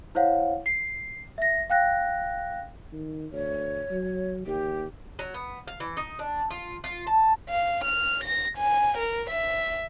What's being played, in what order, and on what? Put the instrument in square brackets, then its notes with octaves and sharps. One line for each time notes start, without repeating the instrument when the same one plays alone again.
[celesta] E4 C5 C#5 F5 F#5
C7
E5 A#6
F5 G5 F#6 A#6
[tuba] D#3
[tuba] D2 [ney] C#5
[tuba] F#3
[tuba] D#2 [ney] G4
[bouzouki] F#3
B3
F5
E3
D#4
D4
F4
F4
A5
[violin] F5
F6
A#6
G#5
A#4
E5